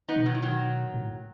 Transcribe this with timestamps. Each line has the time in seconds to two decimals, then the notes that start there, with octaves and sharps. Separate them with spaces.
0.08 B3 D#4
0.16 B2
0.26 D#3 F#3
0.34 E3
0.42 D#3 F#3
0.94 A2